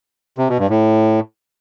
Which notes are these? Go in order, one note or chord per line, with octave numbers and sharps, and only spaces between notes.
C3
B2
G2
A2